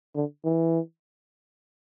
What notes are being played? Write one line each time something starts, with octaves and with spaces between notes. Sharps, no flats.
D3
E3